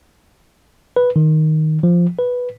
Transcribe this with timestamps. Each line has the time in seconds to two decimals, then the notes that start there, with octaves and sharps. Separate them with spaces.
0.96 B4
1.16 D#3
1.83 F3
2.19 B4